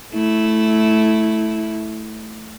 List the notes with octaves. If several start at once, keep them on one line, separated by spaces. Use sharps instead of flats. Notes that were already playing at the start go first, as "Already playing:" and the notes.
A3 E4